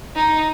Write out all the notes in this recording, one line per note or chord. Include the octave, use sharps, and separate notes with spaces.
D#4